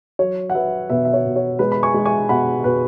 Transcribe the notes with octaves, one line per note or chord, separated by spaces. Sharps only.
F#3 C#5
F#5
F#3 B4 E5
B2 B4 E5
E5
C#5
B2
C#5
G#3 B4
B5
G#5 C#6
G#3
G#5 C#6
B2 F#5 B5
B2 B4